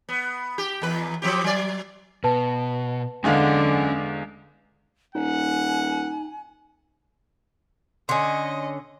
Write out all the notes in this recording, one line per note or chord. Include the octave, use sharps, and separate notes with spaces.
B3
G4
E2 B4
F3 C4 G4
F#3 D5
B2 B4 A5
E2 D3 G#3 C#4 F5 F#5
D#1 D#4 F#5 G#5
D3 C#4 D#5 G#5 C6